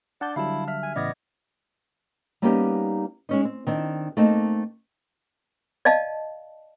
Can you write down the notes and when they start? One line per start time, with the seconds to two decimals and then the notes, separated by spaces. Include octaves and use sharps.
0.21 D4 D5 F#5 A5 G6
0.36 D3 F#3 G3 E4 F5 A5
0.68 E5 F6
0.83 G#5
0.96 A2 C#3 E3 B3 D5 D#5 G#6 A#6
2.42 G3 A#3 B3 C#4 D#4 G4
3.29 G#3 C#4 D#4
3.45 C4
3.67 D#3 C4 D4
4.17 A3 A#3 C4 D#4 A4
5.85 D5 D#5 F5 A5